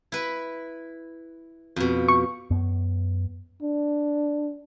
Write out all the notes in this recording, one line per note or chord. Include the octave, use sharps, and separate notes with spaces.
E4 B4
F2 B2
C#6
F#2 B3
D4